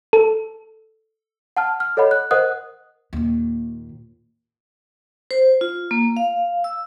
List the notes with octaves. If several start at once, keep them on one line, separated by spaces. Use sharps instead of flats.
A4
F#5 A5 F6
F6
A4 C#5 D#5 F#5 B5
F#6
A#4 C5 D#5 F#5 D#6 F#6
D#2 A#2
C5
F4
A#3
F5
E6